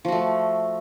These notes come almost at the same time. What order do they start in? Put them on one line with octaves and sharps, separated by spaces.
F3 F#4 A3